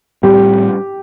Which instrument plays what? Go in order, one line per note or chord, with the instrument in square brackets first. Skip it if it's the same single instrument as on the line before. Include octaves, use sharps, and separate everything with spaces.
[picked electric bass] A2 G3 C4 [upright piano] G4